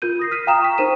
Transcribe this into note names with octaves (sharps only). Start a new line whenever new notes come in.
F4 A#4 G6 D#7
D#6 A#6 C7
F6 B6 D#7
F5 G5 A#5 D#6 E7
C#6 B6
D#4 A#4 C5 D#7 E7